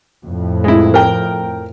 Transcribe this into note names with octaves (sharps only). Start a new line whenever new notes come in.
F2 A2
G#3 E4
A#4 G5